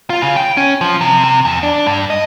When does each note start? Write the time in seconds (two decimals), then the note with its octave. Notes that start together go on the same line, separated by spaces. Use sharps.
0.10 F4
0.22 C#3
0.36 G5
0.57 C#4
0.81 F3
1.01 C3
1.24 C3
1.45 E2
1.63 D4
1.87 G2
2.10 D#5